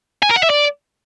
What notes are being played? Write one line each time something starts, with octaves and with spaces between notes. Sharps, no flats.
G#5
A#4
F#5
E5
D5